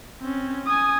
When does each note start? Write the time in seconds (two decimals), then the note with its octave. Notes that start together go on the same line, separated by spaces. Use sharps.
0.21 C4 C#4
0.66 G#5 D#6